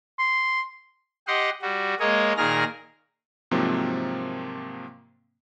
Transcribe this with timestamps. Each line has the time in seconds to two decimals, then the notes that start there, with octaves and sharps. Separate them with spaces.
0.19 C6
1.28 G4 D#5 F#5 C6
1.62 G3 F#4
2.00 G#3 A#3 C#5 D#5
2.37 A#2 D#3 G#4 A#4 F6 A#6
3.51 G#2 C3 F3 F#3 A#3 C4